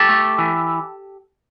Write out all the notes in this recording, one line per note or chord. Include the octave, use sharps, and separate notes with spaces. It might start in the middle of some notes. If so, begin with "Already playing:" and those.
Already playing: G4 A4
A3
E3